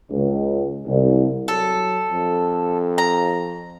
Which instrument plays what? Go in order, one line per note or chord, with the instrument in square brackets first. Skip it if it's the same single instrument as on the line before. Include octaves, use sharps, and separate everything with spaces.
[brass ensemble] C#2
C2
[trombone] F#3 [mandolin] A4
[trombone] F2
[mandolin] A#5